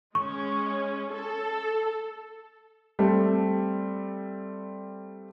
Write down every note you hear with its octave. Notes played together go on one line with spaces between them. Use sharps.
G#3 C#4 C#6
A4
G3 A3 C4